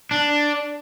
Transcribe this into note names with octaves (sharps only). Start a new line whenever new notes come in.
D4